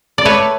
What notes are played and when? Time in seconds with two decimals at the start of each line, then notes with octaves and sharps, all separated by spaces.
0.18 D5
0.25 A3 B4 C#5